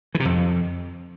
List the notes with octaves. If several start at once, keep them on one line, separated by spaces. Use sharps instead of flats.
E3
C3
F2